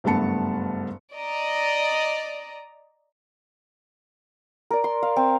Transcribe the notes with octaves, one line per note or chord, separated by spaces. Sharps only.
F#1 G2 A3 B3 A5 C#7
D5 D#5 A#5
A#4 D5
C6
F5
C4